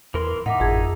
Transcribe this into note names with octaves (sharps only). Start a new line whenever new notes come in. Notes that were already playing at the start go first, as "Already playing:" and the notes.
E2 E3 A#4 C6
A2 D#4 E5 F#5 D6
G#1 F2 G#4 G#6